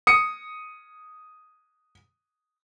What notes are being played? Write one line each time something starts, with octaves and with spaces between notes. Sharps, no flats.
D#6 C#7